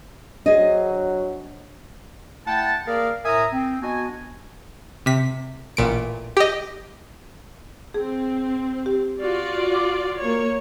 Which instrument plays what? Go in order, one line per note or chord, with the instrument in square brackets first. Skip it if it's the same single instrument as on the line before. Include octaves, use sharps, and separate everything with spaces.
[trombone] F#3 [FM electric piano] D4 [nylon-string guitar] G#4 C5 D#5
[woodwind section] A3 E4 F#5 G5 A5
A#3 G#4 A#4 D5 F5
A2 A#4 E5 G#5 A#5 D#6
C4
B3 D4 F#4 D#5 G#5
[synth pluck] C3 B6
A1 A#2 D7
G4 D#5
[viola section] C4 [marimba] G#4
[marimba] G4
[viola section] F4 F#4 D5
[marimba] D6
[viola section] A#3 C#5